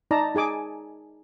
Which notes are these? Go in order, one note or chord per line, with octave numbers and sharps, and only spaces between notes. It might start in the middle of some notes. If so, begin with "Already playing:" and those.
D#4 D5 A5 A#5
D#4 G#4 G#5 D6